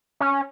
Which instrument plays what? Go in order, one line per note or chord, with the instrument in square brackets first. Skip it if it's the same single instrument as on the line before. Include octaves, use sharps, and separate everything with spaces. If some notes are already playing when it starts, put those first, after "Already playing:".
[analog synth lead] C#4